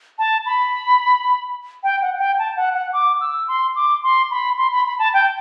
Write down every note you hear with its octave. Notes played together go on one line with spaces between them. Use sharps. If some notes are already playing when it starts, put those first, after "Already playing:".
A5
B5
G5
F#5
F#5
G5
A5
F#5
F#5
D6
E6
C6
D6
C6
B5
C6
B5
B5
A5
G5